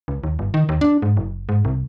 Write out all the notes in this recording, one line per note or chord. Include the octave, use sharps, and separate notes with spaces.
C#2
D#2
G1
D#3
D#2
D4
G#2
F#1
G#2
C2